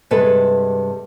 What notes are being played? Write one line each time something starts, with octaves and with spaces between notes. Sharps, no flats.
G2 C3 G#3 A4 B4